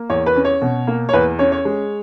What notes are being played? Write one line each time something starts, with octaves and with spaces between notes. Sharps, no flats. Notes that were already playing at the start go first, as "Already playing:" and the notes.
Already playing: A#3
E2 C#5
B4
C#4
C#5
B2
A#3
C#5
E2 B4
C#4 C#5
C#5
G#3